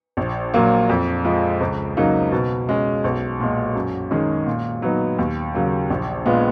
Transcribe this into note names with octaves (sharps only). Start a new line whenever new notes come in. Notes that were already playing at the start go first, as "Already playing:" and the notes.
A#1
A#2 F#3 A#3
F2
F3 G#3
C#2
C#3 F#3 A#3 D#4
B2
G#3 C#4
B1
A#2 G#3
F#2
D#3 G#3 C#4 G#4
A#2
F#3 B3 D#4
D#2
C#3 F#3 A#3
A#1
A#2 G#3 B3 F4